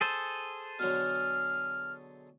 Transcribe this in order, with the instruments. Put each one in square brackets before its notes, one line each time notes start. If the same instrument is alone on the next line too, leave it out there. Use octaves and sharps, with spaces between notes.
[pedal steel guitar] G#4 A4 C5
[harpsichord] B2 D3 F#3 [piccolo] F6